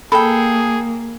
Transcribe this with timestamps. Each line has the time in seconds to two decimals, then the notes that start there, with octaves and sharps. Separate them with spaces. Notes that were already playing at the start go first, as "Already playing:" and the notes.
0.12 A#3 G#4 A4 G5 B5